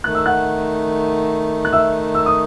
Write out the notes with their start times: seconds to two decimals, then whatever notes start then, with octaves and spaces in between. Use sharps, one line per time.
0.04 D#3 A3 D#4 F#6
0.15 E6
0.26 F#5 F#6
1.65 F#6
1.73 E5 E6
2.15 E6
2.26 D#6